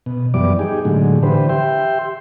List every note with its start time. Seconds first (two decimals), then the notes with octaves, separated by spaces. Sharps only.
0.06 B2
0.34 F#2 E3 G3 B3 D5 D6
0.59 D#4 G4 G#4
0.85 A2 D3 F#3 G#3
1.23 D3 E3 G4 B4 C5
1.49 G4 E5 G5 C6